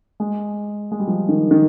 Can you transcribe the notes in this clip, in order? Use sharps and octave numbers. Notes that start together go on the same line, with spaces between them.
G#3
G#3
G3
F3
D#3
D#3